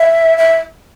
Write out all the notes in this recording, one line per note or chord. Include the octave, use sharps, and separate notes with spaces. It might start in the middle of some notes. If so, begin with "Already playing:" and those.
Already playing: E5
E5